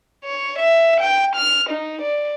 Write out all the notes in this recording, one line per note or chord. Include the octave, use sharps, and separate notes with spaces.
C#5
E5
G5
F6
D#4
D5